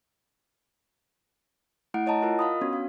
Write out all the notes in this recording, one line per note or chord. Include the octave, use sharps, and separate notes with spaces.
A3 E4 F#5 D7
E4 C#5 D#5 F#5 A5 A#5
F4 A#4 D#5
F5 B5 D#6
B3 C#4 D4 F#4 C#5
F5